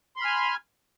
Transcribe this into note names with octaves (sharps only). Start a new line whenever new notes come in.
G#5 B5 C6 F6